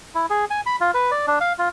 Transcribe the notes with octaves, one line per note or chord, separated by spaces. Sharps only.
E4
G#4
G#5
B5
F4
B4
D5
D4
F5
F4